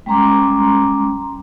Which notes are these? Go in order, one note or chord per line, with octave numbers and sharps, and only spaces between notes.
G3 G#3 C#4 A#5 C6 D6